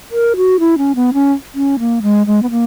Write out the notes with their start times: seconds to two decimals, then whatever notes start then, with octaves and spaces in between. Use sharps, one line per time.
0.11 A#4
0.36 F#4
0.59 E4
0.78 C#4
0.95 B3
1.13 C#4
1.54 C#4
1.79 A#3
2.02 G#3
2.27 G#3
2.42 B3
2.51 A#3